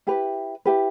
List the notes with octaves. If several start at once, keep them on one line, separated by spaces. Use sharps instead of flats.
E4 G4 B4
E4 G4 B4